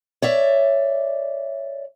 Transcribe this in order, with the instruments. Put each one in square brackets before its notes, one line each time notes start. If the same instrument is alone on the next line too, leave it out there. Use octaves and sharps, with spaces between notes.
[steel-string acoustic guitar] C#5 D5 E5